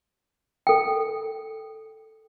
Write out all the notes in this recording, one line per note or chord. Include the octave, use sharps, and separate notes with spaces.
A4 G5